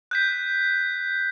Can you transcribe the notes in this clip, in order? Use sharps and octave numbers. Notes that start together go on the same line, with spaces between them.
F#6 G6 B6